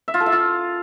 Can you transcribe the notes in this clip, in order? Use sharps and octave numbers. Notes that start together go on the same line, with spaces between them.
E5
F4
A4
E5
F4